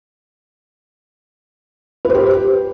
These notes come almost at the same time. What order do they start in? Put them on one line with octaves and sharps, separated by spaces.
B4 C5 G4